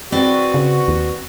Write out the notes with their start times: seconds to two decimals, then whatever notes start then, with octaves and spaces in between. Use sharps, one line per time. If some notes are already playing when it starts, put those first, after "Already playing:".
0.12 C4 F#4 B4 D5
0.54 C#3
0.88 D#2